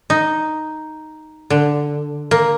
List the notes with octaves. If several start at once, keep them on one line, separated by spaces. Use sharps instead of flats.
D#4
D3
A#3